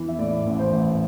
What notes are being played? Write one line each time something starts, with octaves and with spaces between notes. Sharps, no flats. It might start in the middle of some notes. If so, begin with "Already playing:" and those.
Already playing: E2 E3
E5
A2 D5
A1
C5
A1